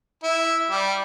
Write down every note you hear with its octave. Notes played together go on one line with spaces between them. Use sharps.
E4
G3